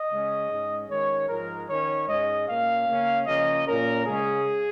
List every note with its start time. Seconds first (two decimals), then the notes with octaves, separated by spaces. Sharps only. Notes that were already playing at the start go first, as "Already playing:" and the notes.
Already playing: D#5
0.11 C#3 G#3 C#4
0.50 G#2 G#3 C#4
0.90 D#3 G#3 C#4 C#5
1.29 G#2 F3 G#3 A#4
1.69 D#3 C#4 C#5
2.08 G#2 G#3 C#4 D#5
2.48 A#2 A#3 C#4 F5
2.88 C#3 A#3 C#4
3.27 C#3 F3 A#3 C#4 D#5
3.67 A#2 A#3 C#4 A#4
4.06 C#3 G#3 C#4 G#4